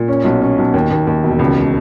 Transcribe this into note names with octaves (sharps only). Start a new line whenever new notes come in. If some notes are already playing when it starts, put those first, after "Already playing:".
Already playing: A#2
C#4
B1
C#4
B1
D#2
D#2
D#2
E1
C#2